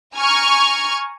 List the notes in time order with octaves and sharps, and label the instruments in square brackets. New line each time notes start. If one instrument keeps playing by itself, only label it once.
[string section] G#5 A#5 C#6 F6 G#6